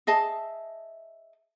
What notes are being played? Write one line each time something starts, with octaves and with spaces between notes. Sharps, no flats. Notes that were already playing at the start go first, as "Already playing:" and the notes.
G#4 D#5 E5 A5